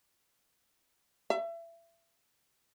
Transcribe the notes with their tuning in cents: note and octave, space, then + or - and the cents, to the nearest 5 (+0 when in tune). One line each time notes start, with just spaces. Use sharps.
E5 +30